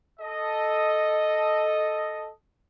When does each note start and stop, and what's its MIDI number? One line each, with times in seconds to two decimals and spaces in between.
0.20 2.30 69
0.20 2.30 75